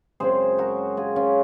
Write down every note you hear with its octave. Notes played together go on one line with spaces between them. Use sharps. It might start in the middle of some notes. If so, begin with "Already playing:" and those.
F#2 C#3 G#3 C4 G#4 C5
F#4 A#4
F4 G#4
C#4 F4